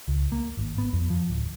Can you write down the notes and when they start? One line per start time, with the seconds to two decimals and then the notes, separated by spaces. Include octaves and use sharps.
0.08 C#2
0.32 A#3
0.57 G#1
0.78 B3
0.93 F2
1.10 F3
1.30 D1